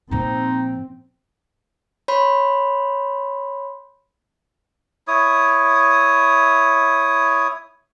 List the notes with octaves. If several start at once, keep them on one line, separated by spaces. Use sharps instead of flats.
A#2 F3 C4 D#4
C#5 B5 C6
E4 C#5 D#6